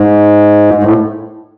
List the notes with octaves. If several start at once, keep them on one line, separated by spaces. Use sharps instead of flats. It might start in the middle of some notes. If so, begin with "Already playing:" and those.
Already playing: G#2
G#2
A2